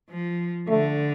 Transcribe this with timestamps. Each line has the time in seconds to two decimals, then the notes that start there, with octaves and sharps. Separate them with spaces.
0.10 F3
0.69 D3 A3